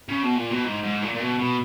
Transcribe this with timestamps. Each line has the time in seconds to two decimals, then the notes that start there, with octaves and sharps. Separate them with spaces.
0.09 C#3
0.23 B2
0.36 A#2
0.50 B2
0.65 G#2
0.83 G#2
1.02 A#2
1.13 A#2
1.20 B2
1.39 B2